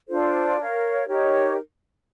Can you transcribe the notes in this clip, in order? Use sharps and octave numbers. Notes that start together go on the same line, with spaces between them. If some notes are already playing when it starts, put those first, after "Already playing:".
D4 F4 A4 C5
A#4 C#5 F5
D#4 G4 A#4 C#5